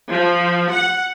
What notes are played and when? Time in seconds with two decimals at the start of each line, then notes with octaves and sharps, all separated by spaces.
0.10 F3
0.73 F#5